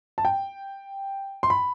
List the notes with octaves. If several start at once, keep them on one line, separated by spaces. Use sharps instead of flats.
A5
G5
C6
B5